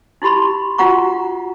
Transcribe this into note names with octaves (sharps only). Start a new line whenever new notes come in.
D#4 E4 G4 B5 C6
D#4 F4 F#4 F#5 A#5 C#6